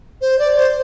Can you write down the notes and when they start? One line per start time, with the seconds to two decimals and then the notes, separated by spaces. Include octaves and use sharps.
0.21 C5
0.39 D5
0.57 C5